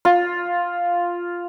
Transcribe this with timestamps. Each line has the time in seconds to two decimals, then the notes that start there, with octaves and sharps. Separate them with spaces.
0.05 F4